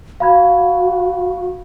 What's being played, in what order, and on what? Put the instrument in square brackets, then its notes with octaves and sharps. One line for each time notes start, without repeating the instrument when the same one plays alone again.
[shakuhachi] F#4 [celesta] F5 B5 G#6